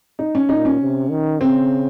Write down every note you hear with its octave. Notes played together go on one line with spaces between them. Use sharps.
D#4
C#4
A#2 D#4
C#4
C3
D#3
C#3 C4